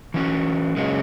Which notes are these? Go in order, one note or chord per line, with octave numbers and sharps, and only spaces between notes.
E3 C#4 F#4
F#2 C#3 G#3 C#4 F#4